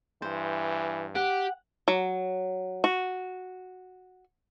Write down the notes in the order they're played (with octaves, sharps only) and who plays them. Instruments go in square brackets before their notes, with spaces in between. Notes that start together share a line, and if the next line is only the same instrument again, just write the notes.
[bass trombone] G2 [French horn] E3 [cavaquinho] C5
[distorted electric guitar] G4 [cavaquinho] F#5
[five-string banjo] F#3
F#4